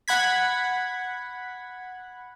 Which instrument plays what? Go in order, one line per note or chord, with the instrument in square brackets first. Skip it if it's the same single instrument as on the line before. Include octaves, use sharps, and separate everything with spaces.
[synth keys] F#5 B5 G#6 B6